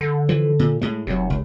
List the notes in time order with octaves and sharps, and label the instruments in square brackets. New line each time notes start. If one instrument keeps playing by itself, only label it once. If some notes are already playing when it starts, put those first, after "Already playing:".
[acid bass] D3
[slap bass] E3 F3
A#2
A2 G#3
[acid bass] F1 [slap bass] C3 F#3
[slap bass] C#2